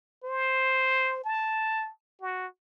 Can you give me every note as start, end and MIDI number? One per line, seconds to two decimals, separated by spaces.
0.24 1.23 72
1.24 1.90 81
2.22 2.47 66